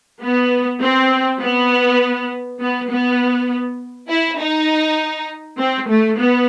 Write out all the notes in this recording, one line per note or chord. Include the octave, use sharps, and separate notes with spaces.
B3
C4
B3
B3
B3
E4
D#4
C4
A3
B3